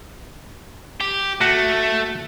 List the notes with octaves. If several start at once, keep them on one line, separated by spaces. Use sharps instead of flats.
G4
A3 F#4